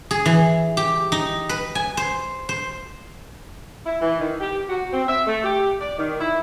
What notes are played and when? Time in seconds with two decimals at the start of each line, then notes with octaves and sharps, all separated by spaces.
0.11 G#4
0.26 E3
0.77 G4
1.12 D#4
1.49 B4
1.75 G#5
1.97 C5
2.49 C5
3.86 E4
4.01 E3
4.20 D#3
4.40 G4
4.69 F#4
4.93 C4
5.08 E5
5.27 A3
5.44 G4
5.81 D5
5.98 D#3
6.20 E4